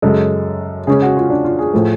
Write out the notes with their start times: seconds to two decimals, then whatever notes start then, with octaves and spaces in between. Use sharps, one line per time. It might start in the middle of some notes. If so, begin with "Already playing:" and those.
0.02 F#2 C#3 G#3 A4
0.87 C#3 G#3 C#4 G#4
1.02 F#4
1.17 F4
1.30 D4
1.45 F4
1.59 G#4
1.73 A2 F3 A3